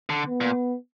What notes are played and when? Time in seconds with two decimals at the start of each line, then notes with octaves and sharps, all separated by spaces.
0.09 D3
0.28 B3
0.41 A#2